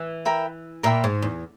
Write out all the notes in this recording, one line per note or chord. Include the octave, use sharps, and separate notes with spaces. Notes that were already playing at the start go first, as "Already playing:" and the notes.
Already playing: E3
A#4 E5 G5 B5
A#2 A#4 E5 G5 B5
G#2
E2